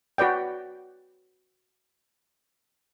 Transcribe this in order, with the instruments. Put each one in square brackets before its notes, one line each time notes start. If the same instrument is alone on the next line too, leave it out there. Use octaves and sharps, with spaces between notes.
[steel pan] F#4 B4 D5 G5